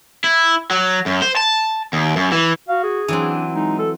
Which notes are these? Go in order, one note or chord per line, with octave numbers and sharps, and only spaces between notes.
E4
F#3
F#2
C5
A5
D#2
F#2
E3
F#4 F5
G#4
E3 F#3 C4 D4
G#3 D#4
A4